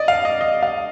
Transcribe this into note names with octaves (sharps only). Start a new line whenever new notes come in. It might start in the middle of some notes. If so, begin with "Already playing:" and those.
Already playing: D5 D#5
F5
D#5
D#5
F5